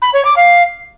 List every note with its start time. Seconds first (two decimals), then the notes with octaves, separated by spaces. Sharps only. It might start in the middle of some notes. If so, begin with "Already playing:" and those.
0.02 B5
0.13 C#5
0.25 D6
0.36 F5